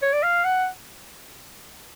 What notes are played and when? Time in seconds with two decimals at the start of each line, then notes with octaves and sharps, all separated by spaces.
0.02 C#5
0.13 D5
0.23 F5
0.44 F#5